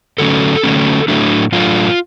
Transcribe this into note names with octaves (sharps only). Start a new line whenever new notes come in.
D3 F#3 A3 C#4 A4
D3 F#3 A3 C#4
A2 F#3 A3 D4
A2 F#3 A3 D4 F4